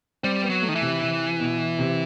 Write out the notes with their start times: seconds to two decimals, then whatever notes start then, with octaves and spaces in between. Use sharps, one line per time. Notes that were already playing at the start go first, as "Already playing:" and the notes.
0.23 G3 C4
0.43 B3
0.50 F#3
0.62 A3
0.69 D#3
0.75 E3
0.81 C3
1.01 C3
1.40 B2
1.79 C3